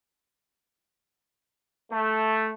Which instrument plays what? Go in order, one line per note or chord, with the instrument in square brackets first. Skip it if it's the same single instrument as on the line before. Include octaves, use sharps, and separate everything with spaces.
[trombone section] A3